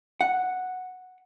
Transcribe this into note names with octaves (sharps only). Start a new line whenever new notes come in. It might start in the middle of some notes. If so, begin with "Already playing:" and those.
F#5